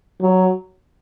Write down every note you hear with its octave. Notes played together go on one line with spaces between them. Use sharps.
F#3